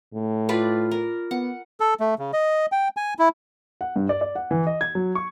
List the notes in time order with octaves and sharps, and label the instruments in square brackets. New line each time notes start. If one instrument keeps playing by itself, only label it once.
[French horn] A2
[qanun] F4 B4 D5
A#4
[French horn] B3 [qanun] F#5
[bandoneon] A4
A3
C#3
D#5
G5
G#5
E4
[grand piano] F#5
G2
D5
D5
F#5
E3
D#5
G#6
F#3
C#6